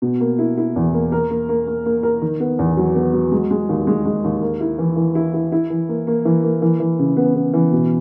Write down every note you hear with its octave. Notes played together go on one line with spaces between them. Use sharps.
B2
A#3
E4
E4
E2
A#3
A#4
A#3
A#3
A#3
A#3
A#4
D#3
B3
E2
F#3
B3
F#3
G#3
G#3
D#2
G#3
G#3
D#2
A#3
E4
E3
E3
E4
E4
E4
E3
A#3
A#3
E3
A#3
E3
E3
C#3
B3
B3
E3
B2